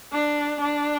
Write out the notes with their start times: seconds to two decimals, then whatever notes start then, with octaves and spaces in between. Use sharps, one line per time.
0.12 D4
0.61 D4